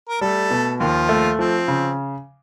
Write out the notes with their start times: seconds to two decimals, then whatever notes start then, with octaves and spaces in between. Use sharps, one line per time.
0.09 A#4
0.21 G3 A3 A4
0.50 B2
0.80 D#2 F3 F4
1.09 A3
1.39 F3 C4
1.68 C#3